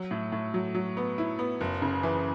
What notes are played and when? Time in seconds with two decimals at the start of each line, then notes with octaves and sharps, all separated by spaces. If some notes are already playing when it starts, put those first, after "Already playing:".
Already playing: F#3
0.11 A2
0.32 A2
0.54 F#3
0.74 F#3
0.97 B3
1.18 E4
1.39 B3
1.61 F#1
1.82 C#3
2.03 E3